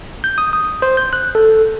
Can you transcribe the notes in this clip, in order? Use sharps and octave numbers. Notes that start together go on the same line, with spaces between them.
G6
D#6
D#6
C5
G6
F#6
A4